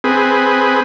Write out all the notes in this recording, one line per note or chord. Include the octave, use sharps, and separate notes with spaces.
C4 G#4 B4